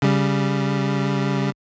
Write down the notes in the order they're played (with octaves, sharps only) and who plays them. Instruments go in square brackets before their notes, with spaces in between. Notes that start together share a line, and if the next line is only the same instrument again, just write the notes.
[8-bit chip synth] C#3 G3